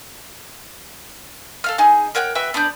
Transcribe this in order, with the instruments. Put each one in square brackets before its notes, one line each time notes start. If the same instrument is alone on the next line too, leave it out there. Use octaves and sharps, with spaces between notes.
[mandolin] A4 F5 F6
D#4 G#4
A#4 C#5 F#5 G5
F#4 B4 E5 G5
B3 D4 D5 G6